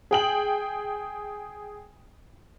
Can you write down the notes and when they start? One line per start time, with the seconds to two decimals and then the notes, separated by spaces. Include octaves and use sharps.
0.11 G#4 G5 F#7